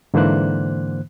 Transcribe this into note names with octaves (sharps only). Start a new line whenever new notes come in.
G#2 D3 E3 A#3 C5 F#6